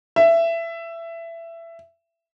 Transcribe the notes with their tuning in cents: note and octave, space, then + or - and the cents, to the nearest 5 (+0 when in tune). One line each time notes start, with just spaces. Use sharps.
E5 +20